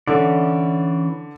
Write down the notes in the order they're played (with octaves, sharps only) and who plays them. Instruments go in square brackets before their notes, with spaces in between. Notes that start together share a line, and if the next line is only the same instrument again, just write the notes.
[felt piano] D3 [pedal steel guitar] E3 C#4 D5